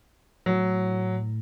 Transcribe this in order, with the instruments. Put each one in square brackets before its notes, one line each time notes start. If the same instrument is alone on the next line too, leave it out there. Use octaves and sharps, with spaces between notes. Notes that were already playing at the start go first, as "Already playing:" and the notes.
[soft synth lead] A2 [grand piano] F#3